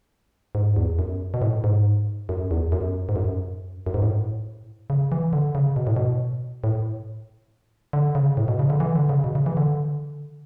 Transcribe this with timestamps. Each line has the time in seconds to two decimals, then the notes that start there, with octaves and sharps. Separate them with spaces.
0.55 G#2
0.76 E2
0.99 F#2
1.34 B2
1.42 A2
1.64 G#2
2.29 F#2
2.51 E2
2.72 F#2
3.09 G#2
3.16 F#2
3.86 F#2
3.94 G#2
4.02 A2
4.90 C#3
5.12 E3
5.33 D3
5.55 C#3
5.76 B2
5.87 A2
5.97 B2
6.64 A2
7.93 D3
8.15 C#3
8.37 A2
8.48 B2
8.59 C#3
8.70 D3
8.80 E3
8.96 D3
9.09 C#3
9.24 B2
9.35 C#3
9.46 E3
9.57 D3